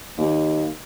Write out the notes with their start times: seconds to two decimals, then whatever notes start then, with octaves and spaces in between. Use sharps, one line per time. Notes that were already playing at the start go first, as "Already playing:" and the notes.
0.17 D#2